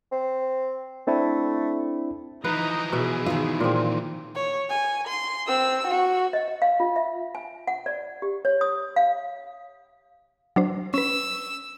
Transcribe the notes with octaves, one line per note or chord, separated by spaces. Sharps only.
C4
A3 C4 D4 E4
E3 F3 D#4 B4 D#5 A#5
B2 E4 G#4 E5
D#3 F4 E5
A#2 C4
C#5
G#5
C6
C4 E6
F#4
D#5
D#5
F5
F4
E5
G#5
F#5
D5
G4
C#5
D#6
F5
F#3 D4 C5
C#4 B4 E6